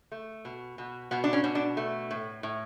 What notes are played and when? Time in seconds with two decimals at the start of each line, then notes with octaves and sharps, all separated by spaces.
0.12 A3
0.45 B2
0.78 B2
1.11 B2 B3
1.24 D4
1.33 C#4
1.44 B2
1.55 D4
1.77 A3
2.11 A2
2.43 A2